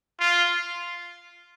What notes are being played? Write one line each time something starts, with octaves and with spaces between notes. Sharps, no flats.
F4